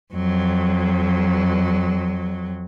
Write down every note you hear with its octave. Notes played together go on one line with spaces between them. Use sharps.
F2 F#3